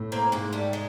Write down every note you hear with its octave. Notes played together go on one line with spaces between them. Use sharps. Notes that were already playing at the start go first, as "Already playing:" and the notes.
Already playing: A2
A#3 C4
G#2 G#3 A#3
G3 A3
G#3